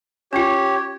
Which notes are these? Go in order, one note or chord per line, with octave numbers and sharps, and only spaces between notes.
C#4 F4 G4 C#5